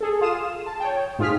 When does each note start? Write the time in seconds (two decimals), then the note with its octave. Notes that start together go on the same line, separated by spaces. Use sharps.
0.01 G#4 A4
0.21 F4 F5 D#6 E7
0.66 A5
0.80 C#5 G5
1.19 G#2 F4 G#4 F6 B6